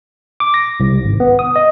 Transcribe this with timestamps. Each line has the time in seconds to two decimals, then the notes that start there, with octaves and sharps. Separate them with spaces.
0.40 D6
0.54 A#6
0.80 C2
1.05 G#1
1.20 B3
1.39 D#6
1.56 D#5